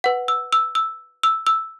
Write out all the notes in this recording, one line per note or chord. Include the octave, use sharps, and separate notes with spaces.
B4 F#5
E6
E6
E6
E6
E6